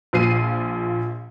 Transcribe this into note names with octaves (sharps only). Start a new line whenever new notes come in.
A#1 F3 C7 D#7